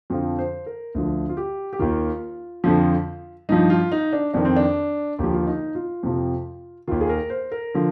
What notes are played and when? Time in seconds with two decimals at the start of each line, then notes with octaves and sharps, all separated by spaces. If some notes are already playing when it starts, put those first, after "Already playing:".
0.10 F2 D3 F3 F4
0.39 C5
0.66 A#4
0.95 D2 D3 F3
1.29 F4
1.37 G4
1.73 G4
1.79 D#2 D#3 F4
2.64 F2 D3 F3
3.49 G2 F3 D#4
3.70 F4
3.92 D#4
4.13 D4
4.34 F2 D#3 D4
4.45 C4
4.56 D4
5.19 D#2 D3 F3 G4
5.34 F4
5.47 D#4
5.75 F4
6.03 F2 C3 F3
6.87 D#2 D#3 F4
7.01 G#4
7.09 A#4
7.30 C5
7.52 A#4
7.74 D3 F3